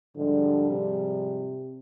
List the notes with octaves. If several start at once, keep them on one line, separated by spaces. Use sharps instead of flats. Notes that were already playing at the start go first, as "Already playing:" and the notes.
G#2 D3 F3 G3
C3